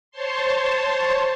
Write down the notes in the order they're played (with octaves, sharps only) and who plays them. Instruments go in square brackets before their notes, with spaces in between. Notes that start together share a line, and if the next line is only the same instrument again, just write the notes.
[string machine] C5 C#5 A5 C6